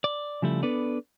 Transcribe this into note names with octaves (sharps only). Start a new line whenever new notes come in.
D5
C#3 F3 G3 A3 E4
B3 D4 A4 B4 D5